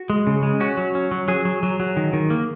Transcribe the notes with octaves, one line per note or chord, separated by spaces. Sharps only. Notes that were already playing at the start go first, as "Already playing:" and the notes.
Already playing: F#4
G#3
C#3
G#3
C#4 F#4
F#3
C#4
F#3
F#3 G#4
F#3
F#3
F#3
D#3
D#3
A#3